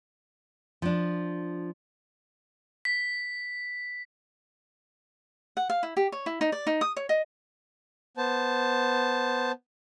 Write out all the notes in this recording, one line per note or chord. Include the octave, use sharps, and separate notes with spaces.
F3 D4
B6
F#5
F5
E4
G4
C#5
E4
D#4
D5
D#4
D#6
C#5
D#5
B3 C5 A5